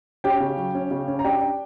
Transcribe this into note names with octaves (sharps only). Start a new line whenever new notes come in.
C#4 G4 G5
C#3
F#3
C#4
C#3
C#4
A#5
D4 G4 G5
D4